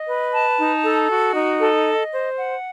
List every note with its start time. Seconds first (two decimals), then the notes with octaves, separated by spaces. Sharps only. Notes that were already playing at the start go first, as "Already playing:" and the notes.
Already playing: D#5
0.08 B4
0.34 A5
0.59 D#4
0.84 A4
1.11 F#4
1.35 D#4
1.61 A4
1.86 D#5
2.12 C5
2.38 F#5